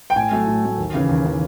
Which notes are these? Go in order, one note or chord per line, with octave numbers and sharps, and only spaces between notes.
G5
A2 G#5
F#3 A3
A2
F#3 A3
D#2
C#3 E3
D#2
C#3 E3